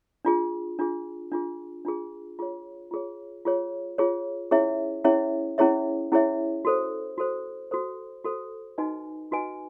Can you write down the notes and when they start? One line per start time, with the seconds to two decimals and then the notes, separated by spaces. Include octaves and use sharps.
0.25 D4 F4 G#4
0.79 D4 F4 G#4
1.32 D4 F4 G#4
1.85 D4 F4 G#4
2.39 F4 G#4 C#5
2.91 F4 G#4 C#5
3.45 F4 G#4 C#5
3.98 F4 G#4 C#5
4.51 C#4 E4 G#4 C#5 E5
5.04 C#4 E4 G#4 C#5 E5
5.58 C#4 E4 G#4 C#5 E5
6.12 C#4 E4 G#4 C#5 E5
6.65 F#4 A4 C5
7.18 F#4 A4 C5
7.71 F#4 A4 C5
8.25 F#4 A4 C5
8.78 D#4 F#4 B4 D#5 G#5
9.31 D#4 F#4 B4 D#5 G#5